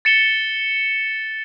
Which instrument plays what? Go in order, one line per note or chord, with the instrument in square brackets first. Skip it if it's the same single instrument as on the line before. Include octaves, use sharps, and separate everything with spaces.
[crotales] A6 C#7 E7 G7